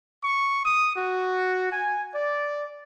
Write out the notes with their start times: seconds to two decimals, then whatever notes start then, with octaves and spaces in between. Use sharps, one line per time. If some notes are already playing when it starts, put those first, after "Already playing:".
0.23 C#6
0.65 D#6
0.96 F#4
1.72 G#5
2.15 D5